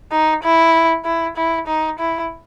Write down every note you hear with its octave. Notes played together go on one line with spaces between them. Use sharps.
D#4
E4
E4
E4
D#4
E4